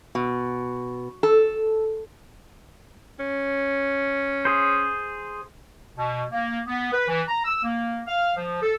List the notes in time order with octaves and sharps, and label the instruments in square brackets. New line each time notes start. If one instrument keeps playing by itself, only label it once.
[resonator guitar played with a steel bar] B2
A4
[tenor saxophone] C#4
[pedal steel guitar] G#4 C5
[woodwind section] B2
A#3
B3
B4
E3
A#5
E6
A#3
F5
F3
A4